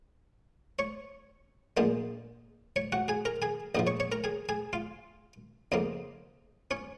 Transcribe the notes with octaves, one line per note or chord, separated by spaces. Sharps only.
C#5 C#6
A#1 A#2 G#3 D#5 D#6
C#5 C#6
F#4 F#5
G#4 G#5
A#4 A#5
G#4 G#5
A#1 G#2 F3 D#5 D#6
C#5 C#6
C#5 C#6
A#4 A#5
G#4 G#5
G#4 G#5
F4 F5
F2 C#3 F3 A#3 D#4 D#5
C#4 C#5